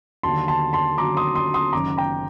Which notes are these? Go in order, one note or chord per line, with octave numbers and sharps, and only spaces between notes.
D#2 D3 F#3 A5 C6
A5 C6
A5 C6
D#2 D3 F#3 A#5 D6
C6 D#6
C6 D#6
C6 D#6
F#1 F#2 D#3 A#5 D6
G5 A#5